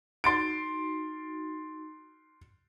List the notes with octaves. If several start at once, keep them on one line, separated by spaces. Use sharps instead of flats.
D#4 F#4 C6 A6 D7